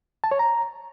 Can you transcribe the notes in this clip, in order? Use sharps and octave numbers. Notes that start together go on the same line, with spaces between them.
A5
C#5
A#5